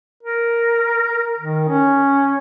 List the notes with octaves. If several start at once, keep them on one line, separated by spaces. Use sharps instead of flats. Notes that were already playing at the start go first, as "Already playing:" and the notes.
A#4
D#3
C#4